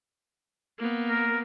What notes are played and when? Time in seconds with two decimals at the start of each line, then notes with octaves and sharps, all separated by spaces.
0.78 A#3 B3
1.10 A#4